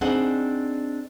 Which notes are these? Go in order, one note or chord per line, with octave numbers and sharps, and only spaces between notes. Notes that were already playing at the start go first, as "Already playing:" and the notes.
C4 D4 D#4 G#4 F#5